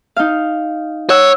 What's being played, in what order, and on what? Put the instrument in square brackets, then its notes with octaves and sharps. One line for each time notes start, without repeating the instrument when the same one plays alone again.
[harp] D#4 F5
[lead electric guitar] C#5 [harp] F#5 E6